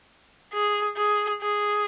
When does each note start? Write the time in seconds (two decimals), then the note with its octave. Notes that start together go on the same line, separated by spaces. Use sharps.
0.53 G#4
0.97 G#4
1.42 G#4